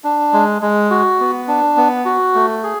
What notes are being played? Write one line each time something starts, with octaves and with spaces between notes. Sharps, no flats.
D4
G#3
G#3
F#4
B3
D4
B3
F#4
A3
G#4